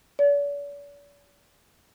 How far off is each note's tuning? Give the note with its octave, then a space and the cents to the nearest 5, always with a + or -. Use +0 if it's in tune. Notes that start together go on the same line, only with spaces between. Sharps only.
D5 -45